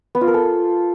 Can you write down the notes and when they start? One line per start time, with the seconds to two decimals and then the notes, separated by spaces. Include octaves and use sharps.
0.15 B3
0.21 F4
0.28 A#4
0.34 A4